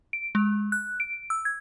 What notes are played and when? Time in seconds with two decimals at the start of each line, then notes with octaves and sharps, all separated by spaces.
0.13 D7
0.35 G#3
0.72 F#6
1.00 D7
1.30 E6
1.45 G#6